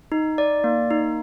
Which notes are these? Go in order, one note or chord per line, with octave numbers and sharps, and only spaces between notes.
D#4
D5
A#3
D#4